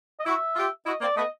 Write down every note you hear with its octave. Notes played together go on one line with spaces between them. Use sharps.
D#5
E4 F#4 E5
F4 G4
E4 F#4 D#5
A#3 C4 D5
A3 B3 D#5